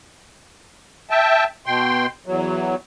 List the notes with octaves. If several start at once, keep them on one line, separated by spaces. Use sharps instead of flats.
E5 G5 A5
B2 G5 C6
E2 F#3